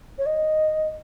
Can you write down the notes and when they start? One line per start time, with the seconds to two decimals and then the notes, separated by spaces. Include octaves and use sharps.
0.18 C#5
0.26 D#5